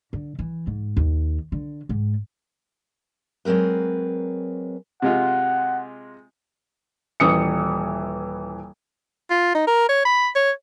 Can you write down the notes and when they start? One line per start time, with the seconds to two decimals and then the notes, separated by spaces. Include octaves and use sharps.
0.13 D3
0.39 E3
0.67 G#2
0.97 D#2
1.52 D3
1.89 G#2
3.45 F#3 G#3 C4 A#4 B4
5.02 C3 G#3 F4 F#5
7.20 D#1 E3 D#6 C#7
9.30 F4
9.55 D#4
9.67 A#4
9.89 C#5
10.05 B5
10.36 C#5